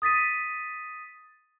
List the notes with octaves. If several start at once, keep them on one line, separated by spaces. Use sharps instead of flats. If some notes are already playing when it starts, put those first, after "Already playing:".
D#6 A6 B6 D#7